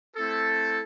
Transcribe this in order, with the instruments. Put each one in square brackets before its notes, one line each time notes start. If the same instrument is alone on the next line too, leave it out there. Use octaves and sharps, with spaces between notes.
[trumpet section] A3 C4 E4 A4